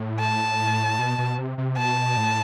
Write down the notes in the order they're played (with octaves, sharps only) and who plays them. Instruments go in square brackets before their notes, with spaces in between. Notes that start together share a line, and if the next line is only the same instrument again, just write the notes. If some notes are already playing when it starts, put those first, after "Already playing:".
Already playing: [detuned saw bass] A2
[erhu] A5
[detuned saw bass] B2
B2
C3
C3
[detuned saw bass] B2 [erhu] A5
[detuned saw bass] A2